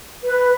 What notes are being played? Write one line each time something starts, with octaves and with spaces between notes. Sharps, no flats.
B4